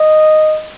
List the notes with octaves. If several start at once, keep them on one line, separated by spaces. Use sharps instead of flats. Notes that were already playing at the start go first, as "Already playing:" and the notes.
Already playing: D#5